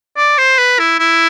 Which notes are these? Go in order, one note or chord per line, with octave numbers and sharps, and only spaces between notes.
D5
C5
B4
E4
E4